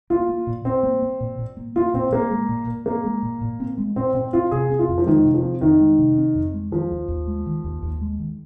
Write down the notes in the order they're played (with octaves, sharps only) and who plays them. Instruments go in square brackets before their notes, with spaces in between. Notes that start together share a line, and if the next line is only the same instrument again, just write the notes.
[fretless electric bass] A#3 [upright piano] F4
[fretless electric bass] A#3
A#2
[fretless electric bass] A#2 [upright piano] C4
[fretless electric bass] A#3
A#3
A#2
A#2
A#3
[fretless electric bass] A#3 [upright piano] F4
[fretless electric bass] A#2 [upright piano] C4
[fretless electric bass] A#2 [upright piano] A#3
[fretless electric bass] G#3
A#2
A#2
[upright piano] A#3 [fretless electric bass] C4
[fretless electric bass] G#3
A#2
A#2
C4
G#3
[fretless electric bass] A#2 [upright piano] C4
[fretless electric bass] A#2 [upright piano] C4
[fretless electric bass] C4 [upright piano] F4
[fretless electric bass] C3 [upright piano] G#4
[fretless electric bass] C4
[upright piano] F4
[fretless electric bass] F2
[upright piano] F3
[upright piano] D#3 [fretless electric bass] G#3
[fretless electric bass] C3
[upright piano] F3
[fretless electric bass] C4
[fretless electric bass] F2 [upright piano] D#3
[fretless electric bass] G#3
C3
C4
F2
G#3
[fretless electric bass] D#3 [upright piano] F3
[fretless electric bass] D#2
D#2
G#3
D#3
D#2
D#2
G#3
D#3